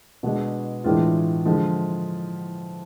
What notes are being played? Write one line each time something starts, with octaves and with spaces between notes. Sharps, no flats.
B2 G#3 D4
A2 E3 G#3 D4 F4
D3 F3 G#3